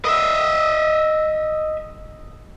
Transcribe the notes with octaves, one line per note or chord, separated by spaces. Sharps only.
D#5 E5